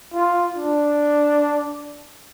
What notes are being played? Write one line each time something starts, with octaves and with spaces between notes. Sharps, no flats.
F4
D4